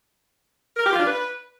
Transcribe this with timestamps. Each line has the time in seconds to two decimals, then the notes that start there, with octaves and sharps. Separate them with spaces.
0.77 A#4
0.84 G4
0.91 F4
0.99 D4
1.06 B4